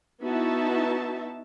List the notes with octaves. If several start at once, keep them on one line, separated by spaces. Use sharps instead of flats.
B3 D#4 E4 F#4 E5 A5